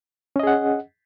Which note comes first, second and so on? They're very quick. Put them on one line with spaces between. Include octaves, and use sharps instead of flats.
C#4 D#5 G#4 F#5